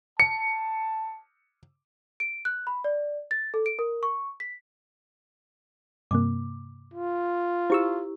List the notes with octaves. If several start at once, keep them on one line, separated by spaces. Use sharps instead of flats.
A5 C#7
D7
F#6
B5
D5
A6
A4
D7
A#4
C#6
B6
G2 C3 A#3 D6
F4
E4 G4 C5 C#6 E6